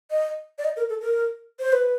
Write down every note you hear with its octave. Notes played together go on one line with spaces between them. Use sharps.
D#5
D5
D#5
A#4
A4
A#4
C5
B4